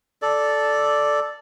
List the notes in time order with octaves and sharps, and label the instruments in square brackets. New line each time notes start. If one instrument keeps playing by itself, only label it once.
[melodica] A4 D5